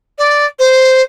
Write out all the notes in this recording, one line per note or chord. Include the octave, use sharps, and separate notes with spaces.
D5
C5